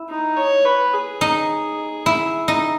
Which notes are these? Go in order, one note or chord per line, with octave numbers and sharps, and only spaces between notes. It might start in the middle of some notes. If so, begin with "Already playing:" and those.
Already playing: E4
D#4
C#5
B4
G#4
D#4
E4
D#4